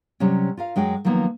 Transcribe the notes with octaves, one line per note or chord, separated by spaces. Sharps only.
C3 F#3 G3 C#4
F4 A#4 F5
F#2 G#3 F#4 G5
D#3 F3 F#3 A#3 B3 D#4